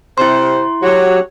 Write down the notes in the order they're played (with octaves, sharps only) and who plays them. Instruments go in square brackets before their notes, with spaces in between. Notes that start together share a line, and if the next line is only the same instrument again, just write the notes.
[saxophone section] C3 C5 [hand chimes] E4 C6
[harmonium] F#3 G4 C#5 [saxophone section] F#4